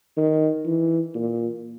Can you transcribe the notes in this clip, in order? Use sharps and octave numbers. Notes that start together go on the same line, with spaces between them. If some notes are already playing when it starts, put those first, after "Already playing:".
D#3
E3
A#2